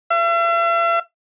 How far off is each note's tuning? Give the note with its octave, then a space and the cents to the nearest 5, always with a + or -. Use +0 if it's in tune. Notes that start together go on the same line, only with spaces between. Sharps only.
E5 +45